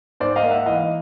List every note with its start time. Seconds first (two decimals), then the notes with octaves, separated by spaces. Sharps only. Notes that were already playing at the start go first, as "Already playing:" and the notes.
0.20 G#2 C5 D5
0.36 D#5 F5
0.43 A#3
0.51 E5 F#5
0.66 E3 D#5 F5